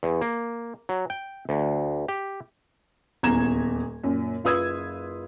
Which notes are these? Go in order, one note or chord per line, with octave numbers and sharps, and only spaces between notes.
E2
A#3
F#3
G5
D2
G4
D#1 E2 A#5 G#6 E7
F#2 A#2
F#1 F4 B4 D#6 E6 G#6